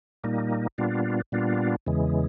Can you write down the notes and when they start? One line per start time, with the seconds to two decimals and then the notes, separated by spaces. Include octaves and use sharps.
0.24 A#2 G3 A#3 D#4
0.78 A#2 G3 B3 D4 F4
1.32 A#2 G3 B3 D4 F4
1.87 E2 C#3 E3 G#3